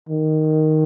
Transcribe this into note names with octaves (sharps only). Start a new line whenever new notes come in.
D#3